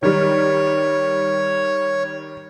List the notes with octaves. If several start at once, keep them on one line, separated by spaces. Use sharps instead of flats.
D#3 G3 C#5